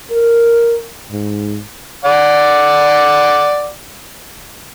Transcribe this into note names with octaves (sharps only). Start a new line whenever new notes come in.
A#4
G#2
D5 F#5 D6